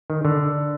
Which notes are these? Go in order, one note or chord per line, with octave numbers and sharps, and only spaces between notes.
D#3
D3